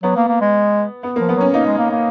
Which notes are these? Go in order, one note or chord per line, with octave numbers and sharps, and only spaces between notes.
F#3 B3
A#3
A#3
G#3
B3
F3 A#3
B3
F#3 C#4
A#3 D#4
G#3
A#3
A#3